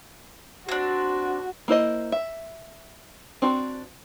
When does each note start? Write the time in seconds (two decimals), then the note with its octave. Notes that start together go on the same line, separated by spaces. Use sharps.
0.69 C4 D4 F#4
1.68 A#3 E4 C5 D#5
2.12 E5
3.42 C4 D4 F#4